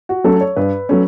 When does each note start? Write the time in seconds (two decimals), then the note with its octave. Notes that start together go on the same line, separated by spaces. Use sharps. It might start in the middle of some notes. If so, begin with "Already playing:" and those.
0.09 F#4
0.24 F#3 A3 C#4 A4
0.41 C#5
0.56 G2 B4
0.89 F#3 A3 C#4